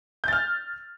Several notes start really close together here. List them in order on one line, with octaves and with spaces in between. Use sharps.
G6 A6 F6